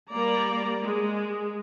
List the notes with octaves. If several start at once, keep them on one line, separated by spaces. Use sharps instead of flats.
G3 A#3 D5 A#5
G#3